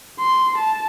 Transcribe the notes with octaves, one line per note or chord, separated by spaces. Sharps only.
C6
A5